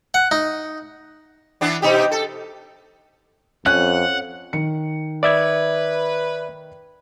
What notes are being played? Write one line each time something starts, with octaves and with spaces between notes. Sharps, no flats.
F#5
D#4
E3 B3 D4
B2 D#4 G4
A4
F2 C#4 F#5 F#6
D#3 C#7
B4 D5 E5 G#6